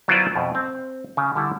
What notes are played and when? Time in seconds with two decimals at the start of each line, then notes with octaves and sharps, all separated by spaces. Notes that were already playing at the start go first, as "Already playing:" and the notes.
0.08 F#3 B3 E4 F4 C5 D5
0.36 F2 B2
0.55 C4
1.17 C#3
1.35 D3 G3 E4 A4